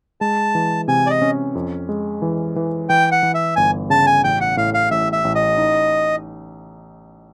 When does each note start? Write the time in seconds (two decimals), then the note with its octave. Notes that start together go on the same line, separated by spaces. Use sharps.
0.21 G#3 A5
0.55 E3
0.88 C3 G#5
1.07 D5
1.11 D#5
1.22 C#4
1.55 F2
1.89 G#3
2.22 E3
2.56 E3
2.89 E3 G5
3.12 F#5
3.23 E3
3.34 E5
3.56 G1 G#5
3.90 C#3 A5
4.07 G#5
4.24 A1 G5
4.41 F#5
4.57 A2 F5
4.74 F5
4.91 A1 E5
5.13 E5
5.25 A1
5.35 D#5
5.57 D#4